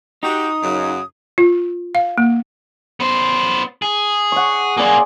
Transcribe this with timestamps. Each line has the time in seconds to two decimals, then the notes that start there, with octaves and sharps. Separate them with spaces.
0.23 D#4 F#4 G4 D#6
0.63 F#2 C#3 F#3
1.38 F4
1.95 F5
2.18 A#3
3.00 B3 C5
3.82 G#4
4.32 F#5 C#6
4.77 A#3 C#4 G#4 D5 C6